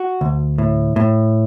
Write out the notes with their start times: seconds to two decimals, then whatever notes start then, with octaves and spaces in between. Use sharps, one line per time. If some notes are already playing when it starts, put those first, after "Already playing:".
Already playing: F#4
0.21 D2
0.58 A2
0.96 A2